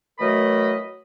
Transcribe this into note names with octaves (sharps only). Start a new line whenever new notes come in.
E3 F#3 A3 A#4 D#5 B5